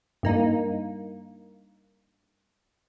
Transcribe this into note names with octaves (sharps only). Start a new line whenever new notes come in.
G2 A#3 D#4